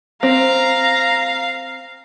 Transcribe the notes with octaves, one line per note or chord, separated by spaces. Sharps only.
C4 F5 A#5